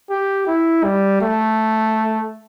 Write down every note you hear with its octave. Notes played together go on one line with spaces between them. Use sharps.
G4
E4
G3
A3